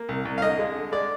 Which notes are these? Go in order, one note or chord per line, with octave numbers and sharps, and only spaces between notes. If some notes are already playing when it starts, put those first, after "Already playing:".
Already playing: A#3
C2
C2
F5
D3 D#5
G#3
D3
G#3 D5